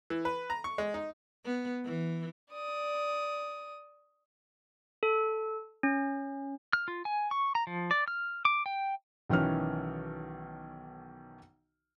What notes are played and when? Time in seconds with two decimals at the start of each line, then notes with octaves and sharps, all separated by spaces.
0.10 E3
0.25 B4
0.50 A#5
0.64 C#6
0.78 G#3
0.94 D#4
1.45 B3
1.85 E3
2.52 D5 D#6
5.03 A4
5.83 C#4
6.73 F6
6.88 F4
7.05 G#5
7.31 C#6
7.55 A#5
7.67 F3
7.91 D5
8.08 F6
8.45 D6
8.66 G5
9.29 B1 D#3 E3 C#4 F6